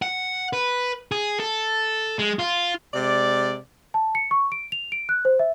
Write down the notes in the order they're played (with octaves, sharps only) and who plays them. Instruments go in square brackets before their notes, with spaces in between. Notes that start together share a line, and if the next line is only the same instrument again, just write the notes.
[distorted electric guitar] F#5
B4
G#4
A4
G#3
F4
[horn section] C3 G#3 D5
[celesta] A5
C#7
C#6
D7
F7
D7
F#6
C5
E5